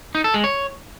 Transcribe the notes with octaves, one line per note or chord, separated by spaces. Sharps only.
D#4
A4
G#3
C#5